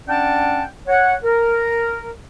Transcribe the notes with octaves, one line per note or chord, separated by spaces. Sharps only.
C#4 D4 D5 F#5 G5 A5
C#5 F#5
A#4